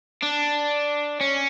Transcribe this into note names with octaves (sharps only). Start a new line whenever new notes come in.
D4
C#4